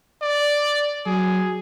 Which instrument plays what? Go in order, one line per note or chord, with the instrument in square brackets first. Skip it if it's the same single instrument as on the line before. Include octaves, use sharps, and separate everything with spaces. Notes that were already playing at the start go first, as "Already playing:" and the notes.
[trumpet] D5
[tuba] F#3 [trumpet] G#4